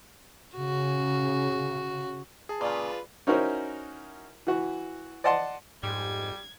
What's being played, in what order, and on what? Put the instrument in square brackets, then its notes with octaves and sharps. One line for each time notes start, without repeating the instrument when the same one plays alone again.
[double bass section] C#3 [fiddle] F#4
[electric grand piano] G#4 A5
[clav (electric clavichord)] A#2 C#3 [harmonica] F4 B4 [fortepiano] D5
[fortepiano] C#4 D#4 E4 F#4 A#4 C5
E3 F#4
D5 D#5 F#5 A5 C6
[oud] F2 G4 [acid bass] G#2 [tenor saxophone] G3 [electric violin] G#6